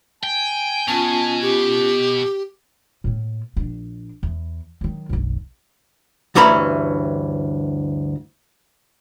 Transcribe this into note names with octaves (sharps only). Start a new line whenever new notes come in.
G5 G#5
B2 C#4 F4 A5
G4
A2 A#3
A#1 D4
E2
D#3 F#3
F#1 B1
D2 G2 E3 C#4 A#5 B5